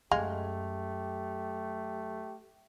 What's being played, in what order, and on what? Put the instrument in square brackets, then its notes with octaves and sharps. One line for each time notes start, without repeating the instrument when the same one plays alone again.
[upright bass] F#2 [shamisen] G#3 F5 [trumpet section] A3 G4